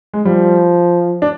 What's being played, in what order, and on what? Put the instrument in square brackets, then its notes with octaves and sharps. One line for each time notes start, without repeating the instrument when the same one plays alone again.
[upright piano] G#3
[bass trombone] F3 [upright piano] G3
[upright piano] D4